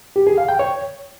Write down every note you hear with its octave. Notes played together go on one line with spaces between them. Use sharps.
G4
G#4
F5
G5
C#5